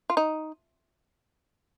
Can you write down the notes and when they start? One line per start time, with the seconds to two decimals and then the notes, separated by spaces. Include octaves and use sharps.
0.10 F4
0.17 D#4